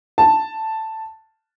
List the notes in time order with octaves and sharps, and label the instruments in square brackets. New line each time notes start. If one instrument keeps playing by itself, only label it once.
[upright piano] A5